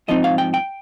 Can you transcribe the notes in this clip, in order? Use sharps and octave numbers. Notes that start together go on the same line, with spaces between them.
G#2 F3 C4 D#4 D#5
F5
G5
G5